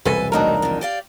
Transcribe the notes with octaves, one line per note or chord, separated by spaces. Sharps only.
E1 C2 A4 B4 G#5
D#3 F#3 A3 D4 D#4 A#4
F2 D#3
G4 D5 F5